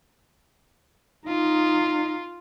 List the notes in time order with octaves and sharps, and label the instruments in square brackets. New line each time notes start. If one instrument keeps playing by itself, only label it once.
[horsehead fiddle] D#4 [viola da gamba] F4